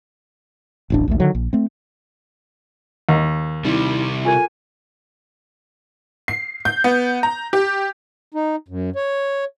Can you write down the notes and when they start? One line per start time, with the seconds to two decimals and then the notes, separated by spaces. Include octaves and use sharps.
0.90 D1 A1 D4
1.08 A#1 D#2 A3
1.20 D3 D#3 F#3
1.35 A#1
1.53 A3 C4
3.09 D#2
3.65 C3 G3 D#4 E4
4.25 F4 A4 A#4 G#5
6.28 C7
6.65 G6
6.84 B3
7.23 A#5
7.53 G4
8.34 D#4
8.68 F#2
8.96 C#5